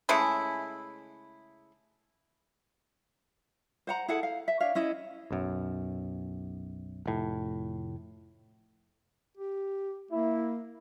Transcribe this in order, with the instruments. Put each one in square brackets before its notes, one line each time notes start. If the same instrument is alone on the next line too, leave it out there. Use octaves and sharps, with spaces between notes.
[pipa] C#3 G#3 A3 E4
[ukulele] C5 F#5 A#5
E4 G#4 A4 F#5
F5
E5
D4 C#5 E5 F5
C#4 E4 D#5
[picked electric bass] B1 F#2
F1 A2
[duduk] G4
[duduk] A#3 [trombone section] E4